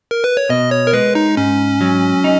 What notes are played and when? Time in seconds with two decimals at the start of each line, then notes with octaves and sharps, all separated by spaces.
0.11 A#4
0.24 B4
0.37 C#5
0.49 B2 D#5
0.71 C#5
0.87 A#4
0.93 G#3 B4
1.15 D#4
1.37 G#2 C#4
1.81 F#3
2.24 D#4